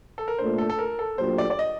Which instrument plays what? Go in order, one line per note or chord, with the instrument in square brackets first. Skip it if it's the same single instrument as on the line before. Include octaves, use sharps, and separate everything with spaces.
[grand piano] A4
A#4
[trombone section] A#2 A3 D4 [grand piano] C5
[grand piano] A4
A4
A#4
A4
[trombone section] A#2 F#3 A3 D4 G4 [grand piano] C5
[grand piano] D5
D5
D#5